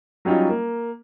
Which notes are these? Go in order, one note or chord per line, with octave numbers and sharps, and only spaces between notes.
F#3 G3 C#4 D#4 F4
A#3